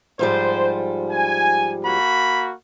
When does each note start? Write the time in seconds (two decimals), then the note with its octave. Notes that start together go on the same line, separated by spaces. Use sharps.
0.19 G#2 F3 G3 C5
1.11 G#5
1.85 A#3 F#4 B5